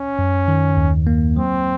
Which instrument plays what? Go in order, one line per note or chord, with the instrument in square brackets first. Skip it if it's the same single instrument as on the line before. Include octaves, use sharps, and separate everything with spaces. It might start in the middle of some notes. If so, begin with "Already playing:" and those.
Already playing: [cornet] C#4
[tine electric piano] F#2
D#3
D#2
A#3
[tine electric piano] F#3 [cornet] C4